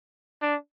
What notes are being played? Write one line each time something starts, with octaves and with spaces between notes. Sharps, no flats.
D4